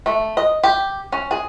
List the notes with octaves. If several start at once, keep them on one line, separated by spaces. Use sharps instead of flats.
A3
D#5
G4
C#4
G#4